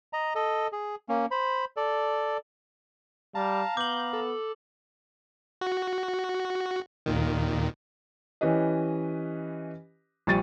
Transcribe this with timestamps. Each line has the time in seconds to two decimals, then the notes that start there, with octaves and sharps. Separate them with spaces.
0.13 D#5 A#5
0.35 A4 D#5
0.72 G#4
1.09 A#3 C#4
1.31 C5 B5
1.77 A4 D5
3.35 G3 F5 A5 A#5
3.77 B3 D6 G6 F#7
4.13 A4
5.61 F#4
7.06 D#2 A#2 D#3
8.41 E3 C#4 G4 B4 D#5
10.27 A#1 G3 C#6 A6 D#7